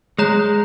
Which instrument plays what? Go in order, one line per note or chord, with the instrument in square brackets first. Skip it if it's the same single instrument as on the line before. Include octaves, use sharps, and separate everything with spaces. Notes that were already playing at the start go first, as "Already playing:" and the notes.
[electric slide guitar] G#3 [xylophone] G#4 C#5 A#5 F#6